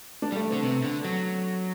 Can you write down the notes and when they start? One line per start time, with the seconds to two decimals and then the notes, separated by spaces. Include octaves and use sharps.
0.22 D4
0.32 G3
0.36 A3
0.50 C4
0.52 D3
0.63 C3 B3
0.84 D3
1.05 F#3